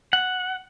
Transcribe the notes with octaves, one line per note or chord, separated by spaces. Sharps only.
F#5